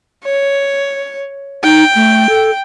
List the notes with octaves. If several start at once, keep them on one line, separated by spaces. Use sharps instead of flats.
C#5
D#4 G5
A3
A4